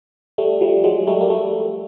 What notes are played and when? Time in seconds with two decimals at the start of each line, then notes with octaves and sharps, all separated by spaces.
0.38 G3 A3
0.61 F3 G3
0.84 F#3 G#3
1.07 G3 A3
1.21 A#3
1.30 G3 A3